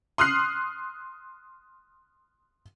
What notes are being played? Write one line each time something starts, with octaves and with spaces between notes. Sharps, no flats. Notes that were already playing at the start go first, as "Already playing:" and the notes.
C6 D#6 F6 F#6 C7